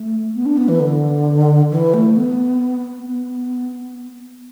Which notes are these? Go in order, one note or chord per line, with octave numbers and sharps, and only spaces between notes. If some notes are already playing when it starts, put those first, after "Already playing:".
Already playing: A3
B3
D4
B3
E3
D3
E3
A3
B3
B3